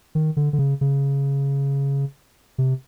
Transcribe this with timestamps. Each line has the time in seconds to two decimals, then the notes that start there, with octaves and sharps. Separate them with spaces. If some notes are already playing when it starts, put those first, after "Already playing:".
0.15 D#3
0.37 D3
0.53 D3
0.59 C#3
0.81 C#3
2.58 C3